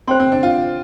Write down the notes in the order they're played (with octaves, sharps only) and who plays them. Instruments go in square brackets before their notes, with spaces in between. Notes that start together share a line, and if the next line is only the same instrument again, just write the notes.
[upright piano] C4 [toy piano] C5 G5 C6
[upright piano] C4
D4
F4